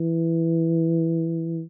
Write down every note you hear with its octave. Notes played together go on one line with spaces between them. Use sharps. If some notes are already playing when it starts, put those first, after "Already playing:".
Already playing: E3